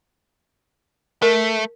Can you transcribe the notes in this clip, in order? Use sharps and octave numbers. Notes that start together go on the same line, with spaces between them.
A3 A#4